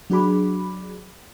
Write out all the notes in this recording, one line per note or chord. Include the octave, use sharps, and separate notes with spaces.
F#3 D4 F#4 G#4 B5 D6